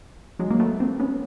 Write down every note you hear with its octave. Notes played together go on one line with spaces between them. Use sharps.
F#3 G#3
A#3
A3 B3
A#3 C4
B3 C#4